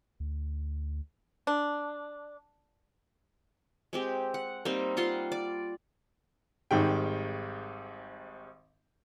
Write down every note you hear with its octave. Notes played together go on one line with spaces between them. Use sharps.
D2
D4
G#3 C4 G4
F#5
G3 A#3 C4 D#4
G3 F4 F#5 C6
D5
G#1 G#2 D#3 G3 G5